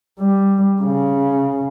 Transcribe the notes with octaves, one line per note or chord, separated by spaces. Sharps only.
G3
C#3